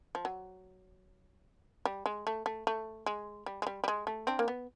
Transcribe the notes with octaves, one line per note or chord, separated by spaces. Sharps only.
F3
F#3
G3
G#3
A3
A3
A3
G#3
G3
G#3
G3
G3
G#3
A3
C4 D4
A#3
B3